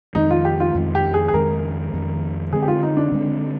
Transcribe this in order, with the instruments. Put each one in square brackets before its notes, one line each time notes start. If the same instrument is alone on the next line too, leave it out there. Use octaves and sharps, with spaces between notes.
[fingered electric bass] F2 D#3 G#3 [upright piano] D#4
[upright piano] F4
G4
F4
[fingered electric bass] F2 D#3 G#3
[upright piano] G4
G#4
G#4
[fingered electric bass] F2 D#3 G#3 [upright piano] A#4
[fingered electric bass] F2 D#3 G#3
[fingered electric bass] D3 G#3 C4 [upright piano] G#4
[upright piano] G4
F4
D#4
D4
[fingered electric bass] D3 G#3 C4